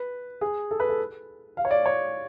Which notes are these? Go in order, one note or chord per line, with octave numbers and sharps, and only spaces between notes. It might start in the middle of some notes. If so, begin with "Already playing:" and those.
Already playing: B4
G#4
A4
B4
A4
F5
C#5
D5
C#5